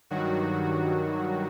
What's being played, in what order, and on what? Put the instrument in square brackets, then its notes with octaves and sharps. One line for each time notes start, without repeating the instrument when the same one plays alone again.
[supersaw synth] G2 D#3 F#3 F#4